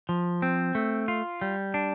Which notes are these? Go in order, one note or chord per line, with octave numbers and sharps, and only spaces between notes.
F3
C4
A3
F4
G3
D4